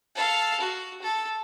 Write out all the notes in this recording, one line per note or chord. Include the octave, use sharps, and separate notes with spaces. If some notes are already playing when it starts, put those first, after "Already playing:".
A4 F5
F#4
A4